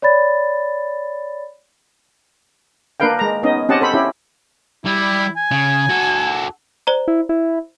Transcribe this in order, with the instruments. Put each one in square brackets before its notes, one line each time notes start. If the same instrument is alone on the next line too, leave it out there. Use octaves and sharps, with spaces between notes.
[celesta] C#5 D5 B5 A6
[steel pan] A#3 D4 A#4 B4 F5 G5
G#3 A#5
B3 C#4 D#4 D#5
C4 C#4 G4 D#5 F#5 A5
A4 C5 B5
C#4 E4 G4
[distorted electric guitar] G3 [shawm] E4
[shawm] G#5
[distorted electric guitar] C#3
F#4 A4
[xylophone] C5 D5 A#5
[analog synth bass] E4
E4